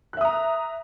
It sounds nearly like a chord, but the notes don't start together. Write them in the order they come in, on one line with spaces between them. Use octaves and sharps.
F#6 E5 D#6 A#5